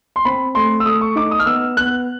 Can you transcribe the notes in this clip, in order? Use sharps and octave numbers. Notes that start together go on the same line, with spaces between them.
C6
C4 B5
A3 C6
E6
A3 D#6
C#6
D#4 D6
D#6
F6
B3 E6
B3 F#6